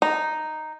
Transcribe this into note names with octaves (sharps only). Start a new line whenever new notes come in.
D#4